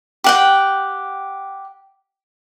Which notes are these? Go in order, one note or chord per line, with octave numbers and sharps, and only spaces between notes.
G4 F#5 G5